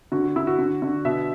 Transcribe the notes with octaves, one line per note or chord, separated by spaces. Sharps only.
D3 F#4
F#4
D3 E4
F#4
D3
D3
B2 E5